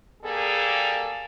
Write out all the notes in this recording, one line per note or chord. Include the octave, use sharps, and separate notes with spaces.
G3 A#3 G#4 A4